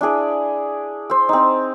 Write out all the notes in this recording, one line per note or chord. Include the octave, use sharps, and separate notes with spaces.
D4 E4 G#4 D5
C5 E6
C4 D#4